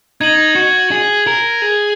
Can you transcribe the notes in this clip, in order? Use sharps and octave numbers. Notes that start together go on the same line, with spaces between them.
D#4 G#6 D#7 F#7
F#4
G#4
A#4
G#4